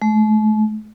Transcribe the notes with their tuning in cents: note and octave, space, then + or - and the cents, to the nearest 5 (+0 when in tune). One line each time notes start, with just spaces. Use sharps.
A3 -40